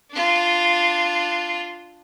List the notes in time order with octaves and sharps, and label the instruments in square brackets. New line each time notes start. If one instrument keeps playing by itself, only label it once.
[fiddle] D4 F4